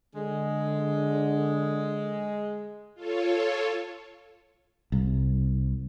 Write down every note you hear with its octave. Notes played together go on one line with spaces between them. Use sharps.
D3 G#3
F4 A4 C#5
C2